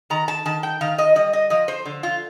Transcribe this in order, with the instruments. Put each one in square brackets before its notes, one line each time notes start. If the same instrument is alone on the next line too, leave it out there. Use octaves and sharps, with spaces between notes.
[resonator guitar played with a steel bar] D#3 A#5
A5
D#3 A5
G5
D#3 F5
D#5
G3 D#5
D#5
F3 D#5
C5
D3
F4